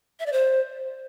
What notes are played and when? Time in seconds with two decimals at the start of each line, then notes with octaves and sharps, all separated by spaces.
0.20 E5
0.26 D5
0.33 C5